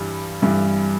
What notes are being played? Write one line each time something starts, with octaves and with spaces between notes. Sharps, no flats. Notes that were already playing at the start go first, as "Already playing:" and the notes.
Already playing: G2 E3 G3
G2 E3 G3